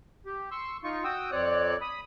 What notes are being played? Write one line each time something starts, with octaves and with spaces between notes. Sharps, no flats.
G4
C6 C#6 E6
D#4 F4 C#6
F#4 G5 D#6 E6
F2 C4 C#5 D5 F#6
B5 D#6